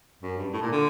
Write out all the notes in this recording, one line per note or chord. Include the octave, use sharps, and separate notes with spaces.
F#2
G2
A2
A#2
D3